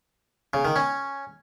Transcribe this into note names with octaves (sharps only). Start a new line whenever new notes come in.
C#3
D#3
C#4